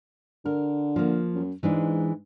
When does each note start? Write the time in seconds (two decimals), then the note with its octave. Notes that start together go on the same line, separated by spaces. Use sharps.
0.45 D3 A#4
0.96 F3 A#3
1.34 F#2
1.63 G#2 E3 G#3 D4